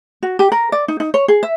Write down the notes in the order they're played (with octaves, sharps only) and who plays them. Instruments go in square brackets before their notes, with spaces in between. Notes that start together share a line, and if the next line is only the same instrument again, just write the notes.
[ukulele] F#4
G4
A#4
D5
D#4
D#4
C#5
G#4
E5